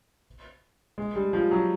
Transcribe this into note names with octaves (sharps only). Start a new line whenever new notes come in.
G#3
G3
F3
F#3